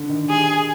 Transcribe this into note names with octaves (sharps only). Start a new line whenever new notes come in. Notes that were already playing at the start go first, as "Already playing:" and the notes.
Already playing: D3
D#3
G3 G#4